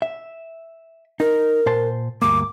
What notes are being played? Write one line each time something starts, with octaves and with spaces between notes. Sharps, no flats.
E5
D#4 A#4
A#2 C5 A5
D2 G2 A#3 D6